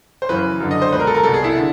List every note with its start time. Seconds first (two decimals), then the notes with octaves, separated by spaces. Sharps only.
0.22 C5
0.29 F#2 C#3 E3 B4
0.60 F#2 D3
0.71 D#5
0.82 C5
0.92 C#2 B2 B4
1.00 A#4
1.07 A4
1.15 A#4
1.23 C2 B2 A4
1.34 G#4
1.44 E4
1.57 D3